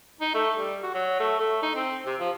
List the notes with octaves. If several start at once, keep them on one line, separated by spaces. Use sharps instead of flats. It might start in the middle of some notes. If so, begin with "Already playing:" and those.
D#4
A3
G3
F#4
F#3
A3
A3
D#4
C4
C3
F3